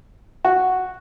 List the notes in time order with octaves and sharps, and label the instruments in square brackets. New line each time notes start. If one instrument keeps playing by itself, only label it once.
[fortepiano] F#4